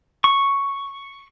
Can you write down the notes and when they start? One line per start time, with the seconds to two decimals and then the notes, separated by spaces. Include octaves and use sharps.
0.24 C#6